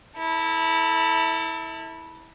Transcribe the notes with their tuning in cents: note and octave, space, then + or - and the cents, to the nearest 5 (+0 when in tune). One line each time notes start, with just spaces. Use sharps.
E4 -20 A4 +25